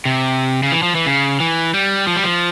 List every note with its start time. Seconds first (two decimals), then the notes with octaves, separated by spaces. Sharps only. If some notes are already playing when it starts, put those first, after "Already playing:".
0.05 C3
0.63 C#3
0.72 E3
0.83 F3
0.95 E3
1.06 C#3
1.40 E3
1.74 G3
2.07 F3
2.16 G3
2.24 F3